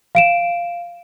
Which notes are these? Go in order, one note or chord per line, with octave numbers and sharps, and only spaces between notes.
F5 D7 E7